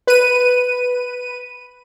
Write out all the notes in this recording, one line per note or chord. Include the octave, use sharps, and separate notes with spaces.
B4 D#7